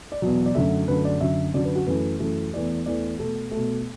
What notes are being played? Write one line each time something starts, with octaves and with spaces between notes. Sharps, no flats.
D5
E2 B2 F#3
D5
F#2 D3 F#3 A3 E5
F#2 D3 F#3 A3 B4
D5
F#2 D3 F#3 E5
F#2 D3 F#3 D5
B4
F#4
F#2 E3 A3 B4
F#2 E3 A3
E2 E3 A3 D5
E2 E3 A3 D5
B2 A3 A4
A3
B2